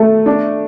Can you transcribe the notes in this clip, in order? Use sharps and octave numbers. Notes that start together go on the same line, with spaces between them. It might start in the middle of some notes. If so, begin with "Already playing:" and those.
Already playing: A3
D4